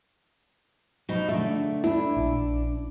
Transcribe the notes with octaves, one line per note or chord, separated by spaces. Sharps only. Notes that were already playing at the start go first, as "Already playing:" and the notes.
B2 F3 D#4
D3 A3 E5
D4 E4
A#1